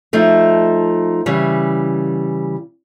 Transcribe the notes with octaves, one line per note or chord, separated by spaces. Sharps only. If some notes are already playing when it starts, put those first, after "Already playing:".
F3 A3 D#4
C#3 E3 G3